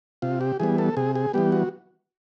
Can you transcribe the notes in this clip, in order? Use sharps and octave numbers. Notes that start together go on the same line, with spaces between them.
C3 F4
G4
E3 G3 B3 G#4
A4
C3 G#4
G#4
E3 G3 B3 G4
F#4